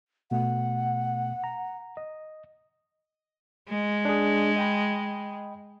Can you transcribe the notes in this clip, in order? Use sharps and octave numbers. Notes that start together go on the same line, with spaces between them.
B2 A3 F#5
A#5
D#5
G#3
D4 G#4
D#5 G5 B5